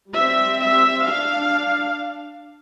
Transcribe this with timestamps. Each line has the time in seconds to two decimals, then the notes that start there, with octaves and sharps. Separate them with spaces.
0.13 G3 C4 E5
0.60 E5
1.07 D4 F5